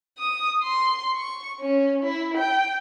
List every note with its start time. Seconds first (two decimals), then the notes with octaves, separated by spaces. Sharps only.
0.18 D#6
0.63 C6
1.15 C#6
1.60 C#4
2.03 E4
2.37 G5